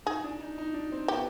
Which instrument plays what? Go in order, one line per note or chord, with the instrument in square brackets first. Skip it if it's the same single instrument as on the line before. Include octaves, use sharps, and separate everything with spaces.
[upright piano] D#4 [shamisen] G#4
[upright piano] D4
D#4
D#4
D4
C4
[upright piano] B3 [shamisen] G4